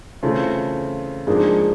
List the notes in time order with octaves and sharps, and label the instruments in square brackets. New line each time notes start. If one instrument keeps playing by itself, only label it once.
[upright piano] C#3 E3 A3 C4 F4
[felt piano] G#2 G#3 [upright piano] F3 A#3 D4